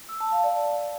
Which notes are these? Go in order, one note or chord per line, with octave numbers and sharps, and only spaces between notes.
E6
A5
F5
D5